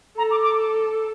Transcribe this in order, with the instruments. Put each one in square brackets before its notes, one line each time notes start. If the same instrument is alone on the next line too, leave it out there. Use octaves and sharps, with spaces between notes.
[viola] A4 [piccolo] A#5
[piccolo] D6
D6